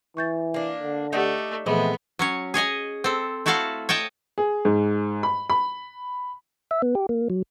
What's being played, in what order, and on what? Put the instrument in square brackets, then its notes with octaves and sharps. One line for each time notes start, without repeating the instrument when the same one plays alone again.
[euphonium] E3 [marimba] C#6 G6 A6
[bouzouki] A#3 D4
[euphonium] D3
[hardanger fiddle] A3 [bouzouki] D#4 D5 [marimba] G4 F#5 G6
[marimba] A#2 E3 F3 [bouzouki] G#3 C4 D#5 [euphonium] A3 [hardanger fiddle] B3
[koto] F#3 C#4 C#5
G#4 C#5 D#5 G#5
C4 A4
A3 E4 F#4 A4 F5 A5
C#5 D#5 G5 A5
[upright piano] G#4
G#2
B5
B5
[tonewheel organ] E5
B3
G4
A#3
F#3